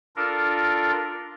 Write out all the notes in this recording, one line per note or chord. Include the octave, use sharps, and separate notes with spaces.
D4 F4 A4 A#4